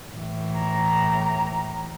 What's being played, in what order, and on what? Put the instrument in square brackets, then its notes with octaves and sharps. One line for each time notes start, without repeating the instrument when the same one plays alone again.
[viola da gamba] A2 E3
[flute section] A#5